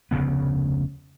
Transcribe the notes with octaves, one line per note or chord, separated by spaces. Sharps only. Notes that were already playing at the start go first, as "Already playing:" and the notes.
F1 D2 C#3 B3